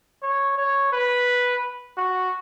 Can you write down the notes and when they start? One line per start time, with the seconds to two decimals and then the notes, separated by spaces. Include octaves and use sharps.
0.23 C#5
0.58 C#5
0.93 B4
1.97 F#4